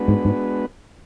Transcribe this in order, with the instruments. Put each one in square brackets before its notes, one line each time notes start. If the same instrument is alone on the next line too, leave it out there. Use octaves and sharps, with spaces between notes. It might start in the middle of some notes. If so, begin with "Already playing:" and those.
Already playing: [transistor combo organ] G#3 B3 D4 F#4 B4
[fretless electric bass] G#2
G#2